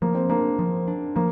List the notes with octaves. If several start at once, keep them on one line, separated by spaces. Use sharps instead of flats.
F3 A#3
C4
A#3 D4
F3
D4
F3 A#3